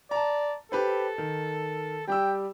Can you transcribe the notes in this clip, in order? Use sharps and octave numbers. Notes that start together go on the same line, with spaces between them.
D5 A5 A#5
G4 A4 B4 C5
D#3
G3 G4 G5 E6